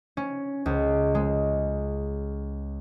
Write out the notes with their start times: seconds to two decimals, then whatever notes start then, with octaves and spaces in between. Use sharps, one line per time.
0.17 C#4
0.66 C#2
1.15 G#3